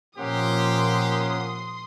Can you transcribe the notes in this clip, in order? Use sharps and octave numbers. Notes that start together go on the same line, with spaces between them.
A#2 F3 A#3 C#4 G4 F#5 C6 D#6